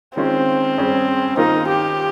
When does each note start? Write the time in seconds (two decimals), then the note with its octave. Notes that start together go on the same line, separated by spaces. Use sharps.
0.16 D#3 G#3 C4 C#4 F4 C5
0.77 G3 C#4 G#4 C5
1.37 D#3 A#3 D#4 F4
1.68 G4